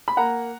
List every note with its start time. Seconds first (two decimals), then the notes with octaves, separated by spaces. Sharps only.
0.08 B5
0.17 A#3 F#5 A#5